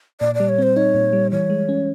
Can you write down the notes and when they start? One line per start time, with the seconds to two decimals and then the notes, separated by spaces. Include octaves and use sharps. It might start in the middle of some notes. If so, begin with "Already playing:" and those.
0.20 A#2 D5
0.35 D5
0.40 G3
0.49 C#5
0.58 C4 C5
0.76 D#4 C#5
0.94 A#2
1.13 G3
1.31 E3 C#5
1.50 G#3
1.69 C#4